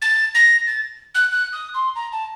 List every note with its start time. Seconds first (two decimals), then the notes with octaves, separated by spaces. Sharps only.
0.02 A6
0.35 A#6
0.67 A6
1.15 F#6
1.31 F#6
1.53 D#6
1.74 C6
1.96 A#5
2.12 A5